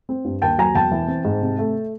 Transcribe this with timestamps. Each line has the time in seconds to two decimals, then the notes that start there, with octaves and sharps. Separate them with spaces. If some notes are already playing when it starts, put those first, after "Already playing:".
0.09 C4
0.25 G2
0.42 D#2 G5 A5
0.58 F#3 G#5 A#5
0.75 E1 G5 A5
0.91 E3
1.08 C4
1.25 G#2
1.41 C3
1.59 A3